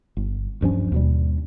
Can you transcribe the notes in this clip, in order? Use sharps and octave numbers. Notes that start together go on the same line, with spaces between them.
G1
D1 G2 F3 C#4
D#2 B2 G3